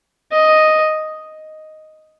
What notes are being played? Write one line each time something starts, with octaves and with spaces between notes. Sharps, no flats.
D#5